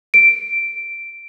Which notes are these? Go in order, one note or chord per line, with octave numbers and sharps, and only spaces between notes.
D7